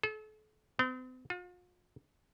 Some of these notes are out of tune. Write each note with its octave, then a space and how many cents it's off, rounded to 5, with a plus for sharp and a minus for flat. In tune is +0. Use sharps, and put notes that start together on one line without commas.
A4 -40
C4 -45
F4 +40